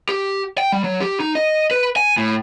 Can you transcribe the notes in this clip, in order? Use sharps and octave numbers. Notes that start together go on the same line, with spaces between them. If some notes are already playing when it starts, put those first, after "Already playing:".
G4
G5
G3
F#3
G4
D#4
D#5
B4
G#5
A2